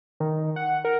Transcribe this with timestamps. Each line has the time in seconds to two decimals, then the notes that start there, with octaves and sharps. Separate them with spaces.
0.20 D#3
0.56 F#5
0.85 A#4